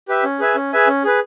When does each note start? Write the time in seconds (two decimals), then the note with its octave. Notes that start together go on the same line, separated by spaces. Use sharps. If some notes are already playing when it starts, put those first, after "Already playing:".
0.08 G4 B4 E5
0.24 C#4
0.40 G#4 B4 E5 G#5
0.55 C#4
0.72 G#4 B4 E5 G#5
0.87 C#4
1.04 G#4 B4